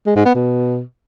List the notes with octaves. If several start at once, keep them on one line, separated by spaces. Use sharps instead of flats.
G#3
G#2
B3
B2